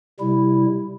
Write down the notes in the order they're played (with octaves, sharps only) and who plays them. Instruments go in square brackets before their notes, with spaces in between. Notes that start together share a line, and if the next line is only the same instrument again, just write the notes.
[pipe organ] C3 G3 E4